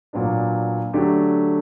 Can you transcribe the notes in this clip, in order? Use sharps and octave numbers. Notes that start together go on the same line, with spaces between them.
A#2 F#3 B3 D4
D3 F#3 A3 D4 G4